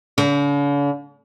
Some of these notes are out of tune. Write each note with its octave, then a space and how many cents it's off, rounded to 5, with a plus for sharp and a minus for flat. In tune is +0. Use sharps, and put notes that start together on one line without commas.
D3 -45